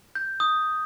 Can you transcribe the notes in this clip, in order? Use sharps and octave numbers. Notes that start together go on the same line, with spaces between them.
G6
D#6